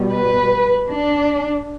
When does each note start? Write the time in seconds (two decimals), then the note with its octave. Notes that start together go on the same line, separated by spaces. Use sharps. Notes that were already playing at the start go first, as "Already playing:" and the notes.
Already playing: B2 G3
0.11 B4
0.92 D4